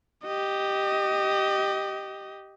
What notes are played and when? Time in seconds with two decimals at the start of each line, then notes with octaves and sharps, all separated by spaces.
0.24 G4 D#5